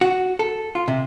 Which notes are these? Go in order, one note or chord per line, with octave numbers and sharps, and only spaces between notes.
F#4
A4
F4
C3